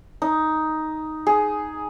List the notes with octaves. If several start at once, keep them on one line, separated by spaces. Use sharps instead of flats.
D#4
G#4